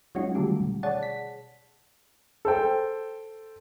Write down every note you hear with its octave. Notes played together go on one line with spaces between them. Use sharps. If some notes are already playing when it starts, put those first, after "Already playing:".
F#3 G#3 C#4 D#4 F4 F#4
D3 D#3 G3 A3 F4 G4
B2
G#4 C#5 D5 F#5 A5
B6
A4 C5 G5